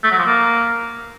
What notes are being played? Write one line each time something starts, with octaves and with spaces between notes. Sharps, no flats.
A3
F#3
F3
A#3